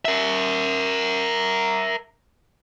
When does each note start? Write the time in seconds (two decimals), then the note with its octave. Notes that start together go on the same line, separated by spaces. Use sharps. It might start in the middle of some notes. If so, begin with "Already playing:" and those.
0.05 A#4 E5